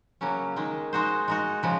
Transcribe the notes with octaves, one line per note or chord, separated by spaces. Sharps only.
C#3 F#3 A#3 C#4
D#3 G#3 D#4
G#3 D#4 F#4 C5
G#3 D#4 F#4
C#3 F3 G#3